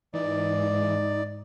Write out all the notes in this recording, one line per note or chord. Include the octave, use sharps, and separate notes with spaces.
G#2 E3 D#4 D5